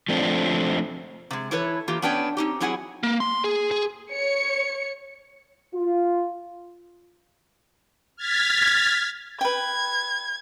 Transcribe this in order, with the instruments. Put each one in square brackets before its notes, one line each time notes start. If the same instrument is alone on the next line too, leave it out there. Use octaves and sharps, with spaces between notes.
[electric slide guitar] F3 A3 C4 D4
[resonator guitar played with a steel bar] C3 G#3
E3 E4 A4 B4 C#5
E3 A#3 F4 G4
B3 C#4 D4 B4 C#5 G5
C4 D#4 G4
F#3 C4 E4 G#4 F#5 G#5
[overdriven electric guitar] A#3
C6
G#4
G#4
[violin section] C#5 C#7
[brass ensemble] F4
[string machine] F6 G#6 A6 B6
[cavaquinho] B4 G5 [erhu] G#6